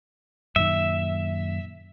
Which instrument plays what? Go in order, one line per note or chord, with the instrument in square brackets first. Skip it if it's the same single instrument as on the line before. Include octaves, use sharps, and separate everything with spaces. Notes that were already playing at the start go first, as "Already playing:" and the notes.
[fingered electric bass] F#2 A#2 D#3 [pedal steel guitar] E5